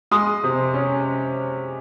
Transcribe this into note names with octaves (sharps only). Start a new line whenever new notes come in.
G#3 C6 D#6
C3
C#4